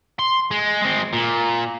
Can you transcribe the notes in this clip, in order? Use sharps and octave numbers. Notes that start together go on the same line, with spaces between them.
C6
G#3
G#3 C4
A#2